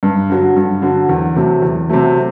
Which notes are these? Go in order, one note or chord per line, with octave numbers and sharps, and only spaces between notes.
G2
D3 F#3
G2
D3 F#3
E2
C3 F#3 A3
E2
C3 F#3 A3